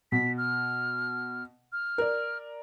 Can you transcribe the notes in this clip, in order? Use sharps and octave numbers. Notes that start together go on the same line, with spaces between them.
B2 B6
F6
F6
A#4 D5